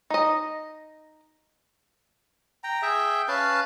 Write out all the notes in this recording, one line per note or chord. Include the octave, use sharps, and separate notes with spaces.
D#4 D#5
G5 A#5
G#4 E5 G5
C#4 B4 F5 A5